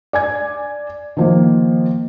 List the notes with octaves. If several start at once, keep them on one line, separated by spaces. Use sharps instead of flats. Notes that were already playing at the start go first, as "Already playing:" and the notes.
D5 G#5 G#6
D#3 F3 A#3